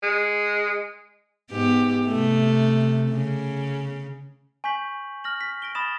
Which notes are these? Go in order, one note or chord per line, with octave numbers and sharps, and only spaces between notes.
G#3
G#2 B3 G4
C3 A3
C#3
G#5 C#6 G6 B6 F#7
F6 A#6 F#7
B6
A#6 D7 G7
B5 D#6 A6 E7